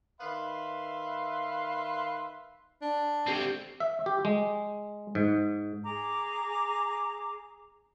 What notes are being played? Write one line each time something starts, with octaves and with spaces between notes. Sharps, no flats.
D#3 B4 E5 F5 B5 C6
D4
D3 C4 G4 C7
E5
G4
G#3
G#2
G#4 A#5 D6